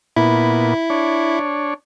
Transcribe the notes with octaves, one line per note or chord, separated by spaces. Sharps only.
A#2 B3 E4
D4 C#5